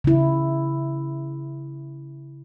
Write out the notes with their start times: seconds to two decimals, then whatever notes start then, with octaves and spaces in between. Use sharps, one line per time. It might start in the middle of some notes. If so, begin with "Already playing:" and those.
0.04 C#3 E4